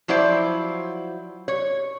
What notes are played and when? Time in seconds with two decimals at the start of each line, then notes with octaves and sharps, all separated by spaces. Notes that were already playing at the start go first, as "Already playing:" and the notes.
0.08 F3 F#3 E4 C5 D5
1.48 C#5